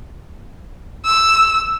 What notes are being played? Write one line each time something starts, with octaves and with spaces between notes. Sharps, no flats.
E6